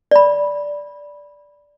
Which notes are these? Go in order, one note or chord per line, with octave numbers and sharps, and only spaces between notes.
D5 B5